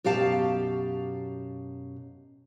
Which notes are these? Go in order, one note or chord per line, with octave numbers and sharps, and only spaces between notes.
F#2 B2 G4 F5 A5